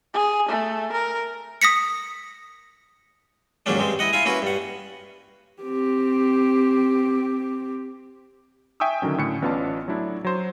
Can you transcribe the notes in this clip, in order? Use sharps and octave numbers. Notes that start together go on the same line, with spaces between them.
G#4
A3
A#4
D#6 A#6 B6 C#7
D#2 G#2 F#3 A#3 C#4 D4
G2 G#3 C4
E4 D#5 F#5
E4 F4 F5 G#5
A#3 C#4 E4 F#4 B4
G2 F#5
C4 G4
E5 G5 G#5 C#6 D#6 E6
D3 D#3 F#3 C#4
A2 D3 C#4 C#7
A1 B3 C#4 F4 D5 A5
F#3 A3 D4 E4
F#3 C5